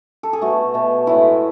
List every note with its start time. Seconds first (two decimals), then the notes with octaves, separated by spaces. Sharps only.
0.23 A4
0.33 G#4
0.42 B2 A3 F#4
0.74 B2 A3
1.07 A2 G#3 E4